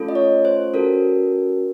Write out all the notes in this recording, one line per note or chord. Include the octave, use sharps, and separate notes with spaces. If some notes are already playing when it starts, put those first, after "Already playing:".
Already playing: A3 C#4 F4 A4
D#5
C#5
C5
C#4 F#4 A4 A#4